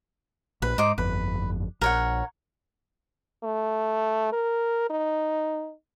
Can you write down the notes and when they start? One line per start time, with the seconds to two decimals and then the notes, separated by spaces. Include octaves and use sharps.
0.62 A#1 B4
0.78 G#2 D#4 C5 D6
0.98 G1 F2 B4
1.81 A#1 A#4 C#5 F#5
3.44 A3
4.33 A#4
4.90 D#4